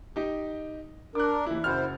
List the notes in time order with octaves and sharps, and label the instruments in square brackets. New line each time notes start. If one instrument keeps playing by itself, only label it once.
[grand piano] D#4 G4
[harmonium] D4 A#4 [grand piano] D6 F#6
[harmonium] D#2 [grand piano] E3 E4
[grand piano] F#1 F#4 F6 [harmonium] E4 C5